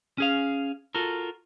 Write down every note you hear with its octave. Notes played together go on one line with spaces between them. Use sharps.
C#4 G#4 F5
F4 F#4 A4 A#4